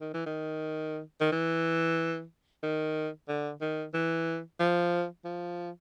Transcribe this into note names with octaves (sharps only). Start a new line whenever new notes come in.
D#3
E3
D#3
D#3
E3
D#3
D3
D#3
E3
F3
F3